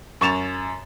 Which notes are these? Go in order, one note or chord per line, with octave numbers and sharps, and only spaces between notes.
F#2 C#6 A6 E7 F7